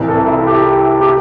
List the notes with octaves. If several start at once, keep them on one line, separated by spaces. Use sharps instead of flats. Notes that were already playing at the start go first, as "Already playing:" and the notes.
Already playing: C2 C3 E3
A4
E4
G4
G4